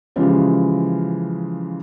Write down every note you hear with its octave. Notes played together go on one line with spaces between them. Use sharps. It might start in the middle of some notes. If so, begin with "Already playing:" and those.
C#3 E3 F3 G#3 C#4 G4